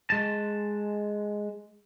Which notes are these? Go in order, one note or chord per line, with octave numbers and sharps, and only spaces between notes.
G#3 A5